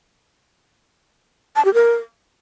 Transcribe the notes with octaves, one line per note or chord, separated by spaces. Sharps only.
A5
G4
A#4